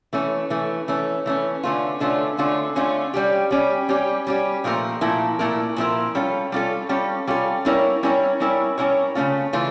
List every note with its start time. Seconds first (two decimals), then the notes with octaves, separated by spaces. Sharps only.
0.13 E3 A3 C#4
0.50 E3 A3 C#4
0.88 E3 A3 C#4
1.26 E3 A3 C#4
1.63 D3 A3 C#4 F4
2.00 D3 A3 C#4 F4
2.38 D3 A3 C#4 F4
2.76 D3 A3 C#4 F4
3.14 G3 C#4 G4
3.51 G3 C#4 G4
3.89 G3 C#4 G4
4.27 G3 C#4 G4
4.64 A#2 F3 A3 E4 A#4
5.01 A#2 F3 A3 E4 A#4
5.39 A#2 F3 A3 E4 A#4
5.76 A#2 F3 A3 E4 A#4
6.15 G3 C#4 F4 A4
6.52 G3 C#4 F4 A4
6.89 G3 C#4 F4 A4
7.27 G3 C#4 F4 A4
7.65 G3 C#4 E4 A#4 C#5
8.03 G3 C#4 E4 A#4 C#5
8.40 G3 C#4 E4 A#4 C#5
8.78 G3 C#4 E4 A#4 C#5
9.15 C#3 E3 A3 C#4 F4
9.53 C#3 E3 A3 C#4 F4